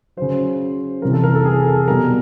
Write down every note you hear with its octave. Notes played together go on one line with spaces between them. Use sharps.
C#3 F#3 C5
C3 E3 G3 A#4
A4
A#4
A4
G#4
A4
B2 G3 A#4